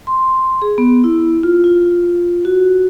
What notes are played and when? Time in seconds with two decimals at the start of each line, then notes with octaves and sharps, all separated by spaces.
0.07 C6
0.62 G#4
0.78 B3
1.04 E4
1.43 F4
1.64 F4
2.45 F#4